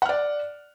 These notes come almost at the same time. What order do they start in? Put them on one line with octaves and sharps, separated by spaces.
F#5 F6 D5